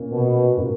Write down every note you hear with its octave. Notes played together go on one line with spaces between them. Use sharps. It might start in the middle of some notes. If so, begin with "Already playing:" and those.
Already playing: A#2 A#3 C#4 A#4
B2
A#2 A#3 C#4 F#4 A#4